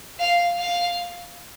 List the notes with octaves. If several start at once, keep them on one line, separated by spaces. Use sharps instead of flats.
F5
F5